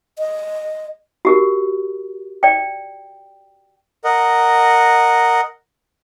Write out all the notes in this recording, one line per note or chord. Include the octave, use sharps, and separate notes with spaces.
D#5
F#4 G4 A#4
D5 G5
A#4 D#5 F#5